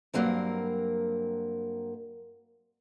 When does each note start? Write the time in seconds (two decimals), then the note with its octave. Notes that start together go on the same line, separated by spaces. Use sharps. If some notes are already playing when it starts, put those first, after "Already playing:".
0.14 G2 C3 F#3 A#3 C4 A#4